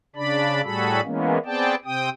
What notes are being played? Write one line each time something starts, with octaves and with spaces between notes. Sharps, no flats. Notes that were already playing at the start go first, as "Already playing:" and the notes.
C#3 D4 D5 B5
A2 G3 F#4 G#4 A4 B5
E3 G#3 A#3 B3 C#4
B3 C4 G#4 D5 G5 A5
C3 C4 G5 D#6